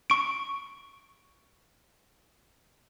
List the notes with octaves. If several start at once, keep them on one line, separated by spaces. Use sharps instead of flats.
C#6 D7